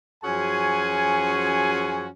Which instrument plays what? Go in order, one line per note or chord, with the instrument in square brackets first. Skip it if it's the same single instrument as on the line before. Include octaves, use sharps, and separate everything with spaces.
[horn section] F#2 F3 C#4 F#4 G#4 G#5